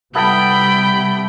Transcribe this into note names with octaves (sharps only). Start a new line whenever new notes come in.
C3 G3 B3 E4 A4 G5 B5